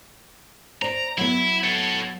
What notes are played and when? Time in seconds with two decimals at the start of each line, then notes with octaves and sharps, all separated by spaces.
0.82 C5 D5 A#5
1.18 F#3 B3 E4
1.63 A4 C#5